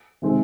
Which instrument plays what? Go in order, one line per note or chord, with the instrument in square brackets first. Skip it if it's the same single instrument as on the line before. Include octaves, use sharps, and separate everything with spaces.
[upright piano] C3 D#3 G#3 C4